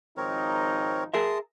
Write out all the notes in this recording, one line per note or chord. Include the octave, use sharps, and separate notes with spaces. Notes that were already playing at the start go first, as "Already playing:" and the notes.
G#1 F3 C4 D#4 A#4 C#5
G#4 A#4 E5 A5 C6 D#6